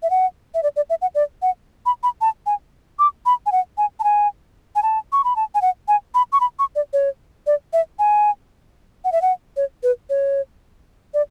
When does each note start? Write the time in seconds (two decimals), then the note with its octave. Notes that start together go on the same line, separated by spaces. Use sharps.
0.03 E5
0.10 F#5
0.54 E5
0.63 D5
0.76 D5
0.90 E5
1.02 F#5
1.15 D5
1.42 F#5
1.86 B5
2.03 B5
2.21 A5
2.46 G#5
2.99 D6
3.26 B5
3.46 G#5
3.52 F#5
3.78 G#5
4.00 A5
4.04 G#5
4.75 G#5
4.83 A5
5.12 C#6
5.24 B5
5.36 A5
5.55 G#5
5.62 F#5
5.88 G#5
6.15 B5
6.32 C#6
6.40 B5
6.59 C#6
6.76 D5
6.93 C#5
7.47 D5
7.73 E5
7.99 G#5
9.05 F#5
9.12 E5
9.22 F#5
9.57 C#5
9.83 B4
10.10 C#5
11.14 D5